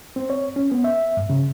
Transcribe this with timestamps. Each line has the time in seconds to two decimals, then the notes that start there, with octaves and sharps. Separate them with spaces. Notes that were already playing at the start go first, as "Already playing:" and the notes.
0.16 C4
0.30 C#5
0.56 C#4
0.72 B3
0.84 E5
1.17 G2
1.30 C#3